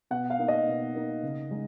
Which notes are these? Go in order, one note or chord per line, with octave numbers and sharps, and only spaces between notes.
B2 F#5
F5
A#3 D#4
D#5
B2
A#3 D#4
C#3
G#3 D#4